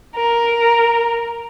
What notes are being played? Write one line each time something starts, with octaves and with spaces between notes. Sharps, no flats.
A#4